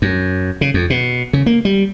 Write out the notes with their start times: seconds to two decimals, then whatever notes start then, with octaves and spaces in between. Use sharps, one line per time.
0.02 F#2
0.61 C#3
0.74 F2
0.90 B2
1.33 C#3
1.46 A#3
1.65 G3